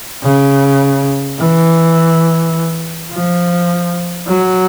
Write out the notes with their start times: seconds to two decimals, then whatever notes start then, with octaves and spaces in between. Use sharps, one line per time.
0.23 C#3
1.39 E3
3.12 F3
4.27 F#3